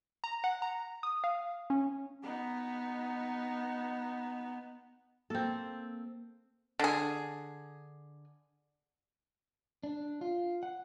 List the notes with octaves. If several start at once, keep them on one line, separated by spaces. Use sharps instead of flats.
A#5
F#5
A#5
D#6
F5
C#4
B3 D#4
A#3 C4 A4
D3 G#4
D4
F4
F#5